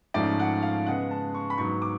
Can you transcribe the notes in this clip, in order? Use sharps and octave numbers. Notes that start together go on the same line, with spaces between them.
G#2 F3 A3 C#4 D5
F#5
F5
C#3 G#3 B3 F#5
A5
C#6
B5
G#2 F#3 B3 C#6
D6